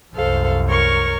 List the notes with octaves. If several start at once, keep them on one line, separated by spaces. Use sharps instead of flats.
C2 F#2 A4 C5 F5
A#4 C#5 C#6